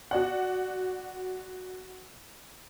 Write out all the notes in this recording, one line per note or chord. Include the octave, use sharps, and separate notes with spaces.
F#4 D5 F#5